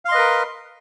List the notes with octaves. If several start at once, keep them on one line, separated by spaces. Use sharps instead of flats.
A#4 B4 D#5 F5 C6